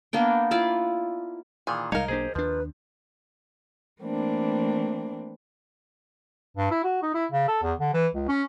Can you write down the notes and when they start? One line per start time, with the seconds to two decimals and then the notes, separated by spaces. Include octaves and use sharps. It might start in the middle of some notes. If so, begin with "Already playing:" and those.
0.13 A#3 B3 D4 G5
0.51 E4 F4 D5
1.67 A#2 D#3 E3 G#4
1.92 C2 G3 G#3 D#4 A#4 C#5 F5
2.08 B1 A#3 D4 G4 G#4 C5
2.35 D#2 F3 D4 B4
4.02 E3 A3 A#3 C4 D4
6.57 G2
6.71 E4
6.84 F#4
7.03 D#4
7.14 E4
7.32 C#3
7.48 A4
7.63 E2
7.79 D3
7.94 E3
8.14 C#2
8.28 C#4